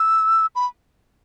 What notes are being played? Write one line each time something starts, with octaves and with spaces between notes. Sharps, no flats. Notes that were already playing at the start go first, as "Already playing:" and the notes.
Already playing: E6
B5